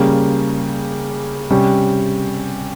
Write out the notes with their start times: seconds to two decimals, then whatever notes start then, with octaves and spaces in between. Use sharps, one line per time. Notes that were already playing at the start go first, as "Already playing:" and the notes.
Already playing: C#3 G3 A#3 C#4
1.50 C3 G3 C#4